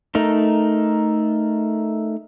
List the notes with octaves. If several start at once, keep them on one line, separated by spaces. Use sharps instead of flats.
A3 D#4 A#4